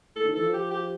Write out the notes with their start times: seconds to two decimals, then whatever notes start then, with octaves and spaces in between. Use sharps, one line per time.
0.16 A2 A4
0.25 D#3
0.34 E3 A4
0.44 F3
0.53 G4
0.71 G4